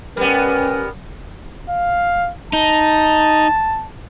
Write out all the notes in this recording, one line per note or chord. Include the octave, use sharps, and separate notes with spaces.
G3 B3 C#4 A#4 B4
F5
D#4 A5